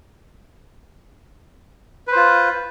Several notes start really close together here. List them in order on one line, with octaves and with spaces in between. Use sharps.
B4 C5 F4